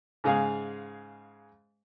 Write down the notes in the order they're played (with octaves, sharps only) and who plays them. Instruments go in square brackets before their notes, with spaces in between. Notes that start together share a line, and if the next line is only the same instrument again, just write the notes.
[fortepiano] G#2 C#3 G#3 G#4 F5